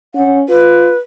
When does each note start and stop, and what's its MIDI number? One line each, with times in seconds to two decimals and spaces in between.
0.15 0.43 61
0.15 0.38 78
0.49 0.92 65
0.49 0.98 71